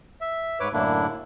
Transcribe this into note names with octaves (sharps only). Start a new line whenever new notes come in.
E5
G#2 B4 C#5 D6
F#2 A2 D3 A#3 D4 E4